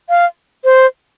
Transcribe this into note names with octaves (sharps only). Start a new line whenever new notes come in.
F5
C5